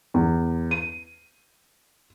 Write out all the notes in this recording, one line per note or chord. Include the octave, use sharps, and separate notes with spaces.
E2
D#7